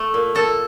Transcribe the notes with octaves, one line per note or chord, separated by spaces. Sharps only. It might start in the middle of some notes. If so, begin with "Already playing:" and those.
Already playing: A3
A#2
A#2 A4